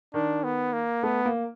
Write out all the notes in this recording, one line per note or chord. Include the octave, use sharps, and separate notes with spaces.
D#3 D4
B3
A#3
A3 B3
A#3